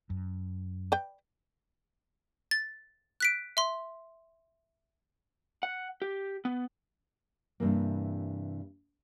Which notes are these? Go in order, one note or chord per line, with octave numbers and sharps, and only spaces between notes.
F#2
B4 D5 G5
A6
F#6 B6 D7
E5 C6
F#5
G4
B3
G2 C3 E3 A#3